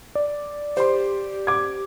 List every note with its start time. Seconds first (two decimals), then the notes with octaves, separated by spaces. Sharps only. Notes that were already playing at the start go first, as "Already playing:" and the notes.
0.15 D5
0.77 G4 C5 C6
1.47 D6 G#6